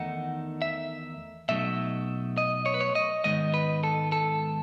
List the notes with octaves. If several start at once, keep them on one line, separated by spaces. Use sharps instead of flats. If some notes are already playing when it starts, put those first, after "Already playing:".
Already playing: E2 D#3 A3 D#4 F#5
E5
B2 F#3 A3 D#4 E5
D#5
C#5
B4
C#5
D#5
G#2 D#3 G#3 B3 D#4 D#5
B4
A4
A4